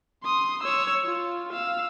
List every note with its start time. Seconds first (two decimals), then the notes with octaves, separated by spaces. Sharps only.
0.24 C6 D#6
0.63 C#5 E6
1.05 F4
1.52 F5 E6